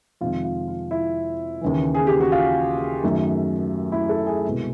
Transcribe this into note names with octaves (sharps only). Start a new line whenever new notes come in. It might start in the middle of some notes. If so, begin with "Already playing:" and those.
F2 C3 D#3 G#3 F4
F4
F4
E4
D#2 C#3 E3
G#4
G4
F#4
F4
F#2 D#3 F#3 A3
E4
A4
G#4
C2 B2 G#3